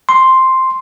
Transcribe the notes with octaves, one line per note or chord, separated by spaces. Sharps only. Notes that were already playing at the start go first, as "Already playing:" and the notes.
C6